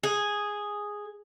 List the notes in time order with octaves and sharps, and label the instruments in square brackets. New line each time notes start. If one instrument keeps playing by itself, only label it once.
[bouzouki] G#4